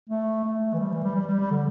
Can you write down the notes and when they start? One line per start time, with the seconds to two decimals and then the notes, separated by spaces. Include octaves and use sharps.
0.09 A3
0.44 A3
0.73 E3
0.79 G3
0.92 E3
1.04 G3
1.15 G3
1.27 G3
1.39 G3
1.51 D3